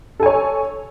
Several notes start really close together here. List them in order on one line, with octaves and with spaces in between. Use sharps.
A4 G#5 C#5